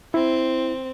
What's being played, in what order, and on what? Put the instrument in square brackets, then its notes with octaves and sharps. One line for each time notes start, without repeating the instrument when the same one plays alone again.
[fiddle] C4 [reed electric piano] E4